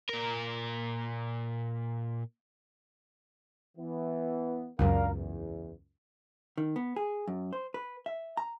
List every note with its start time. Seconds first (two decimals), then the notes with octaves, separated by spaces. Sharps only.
0.09 A#2 A#4
3.77 E3 B3
4.79 C#2 F#2 D4 A#4 F5
5.13 E2
6.58 D#3
6.76 B3
6.96 G#4
7.28 F#2
7.53 C5
7.74 B4
8.06 E5
8.37 A#5